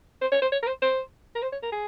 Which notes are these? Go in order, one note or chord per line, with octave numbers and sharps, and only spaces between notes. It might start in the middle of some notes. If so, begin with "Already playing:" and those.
C5
C#5
C5
C#5
A#4
C5
C5
A#4
C5
C#5
A#4
G#4